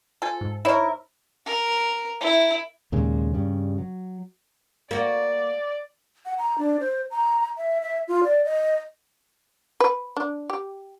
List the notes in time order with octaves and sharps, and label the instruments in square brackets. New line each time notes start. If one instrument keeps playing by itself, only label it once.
[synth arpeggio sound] F4 C5 G#5 [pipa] A4
[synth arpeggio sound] G#2
[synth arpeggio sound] D#4 C5 C#5 [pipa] E4 A#4
[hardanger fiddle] A#4
E4
[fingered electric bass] D#2 A#2 C#3 G#3
G2 C#3 G3
F#3
[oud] A#3 F#4 [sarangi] D5
[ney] F#5
A#5
D4
C5
A#5
E5
E5
F4
D5
D#5
[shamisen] B4
D4
G4